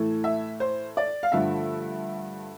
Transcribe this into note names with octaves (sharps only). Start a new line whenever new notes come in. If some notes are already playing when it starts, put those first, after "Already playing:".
Already playing: A2 E3 A3
E5
C5
D5
F5
G2 D3 F3 A3 E5